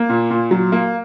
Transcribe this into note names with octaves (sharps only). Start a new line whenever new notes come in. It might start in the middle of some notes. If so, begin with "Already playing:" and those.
Already playing: A#3
A#2
A#2
F#3
A#3